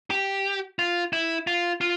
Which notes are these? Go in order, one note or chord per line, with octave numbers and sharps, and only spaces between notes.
G4
F4
E4
F4
F4